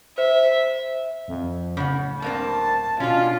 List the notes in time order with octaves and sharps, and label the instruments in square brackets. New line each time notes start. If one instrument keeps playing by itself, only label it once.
[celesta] C5 [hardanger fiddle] E5
[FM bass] F2
[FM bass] D1 [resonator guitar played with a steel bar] C#3 F#5
[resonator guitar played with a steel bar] G2 A#3 C4 [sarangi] A5
[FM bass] B2 [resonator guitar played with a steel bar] C#4 D4 [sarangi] F4